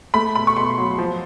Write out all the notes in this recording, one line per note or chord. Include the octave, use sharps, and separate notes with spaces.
A3 B5
B2 B5
C#6
B2 C6
F#3
F3